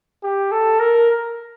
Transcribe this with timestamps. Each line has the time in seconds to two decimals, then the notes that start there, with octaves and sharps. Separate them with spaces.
0.23 G4
0.51 A4
0.80 A#4